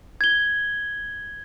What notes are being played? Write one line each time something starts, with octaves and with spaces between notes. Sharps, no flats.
G#6 G7